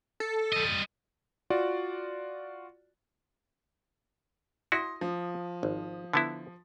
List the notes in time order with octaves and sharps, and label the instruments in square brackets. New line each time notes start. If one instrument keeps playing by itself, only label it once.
[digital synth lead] A4
[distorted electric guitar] G3 D#5
[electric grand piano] F4 F#4 D5
[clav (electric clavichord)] E4 F#4 [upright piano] C6 D#6 A#6
[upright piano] F3
[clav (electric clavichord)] G#1
D3 B3 E4